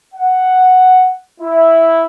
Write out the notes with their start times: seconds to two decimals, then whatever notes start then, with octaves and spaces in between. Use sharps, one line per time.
0.15 F#5
1.41 E4